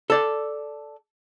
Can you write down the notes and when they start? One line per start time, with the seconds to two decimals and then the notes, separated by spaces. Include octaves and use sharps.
0.10 A4 D5